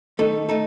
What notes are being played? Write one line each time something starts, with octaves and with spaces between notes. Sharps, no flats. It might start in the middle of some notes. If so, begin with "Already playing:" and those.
D#3 A3 D#4 A4
A3 D#4 A4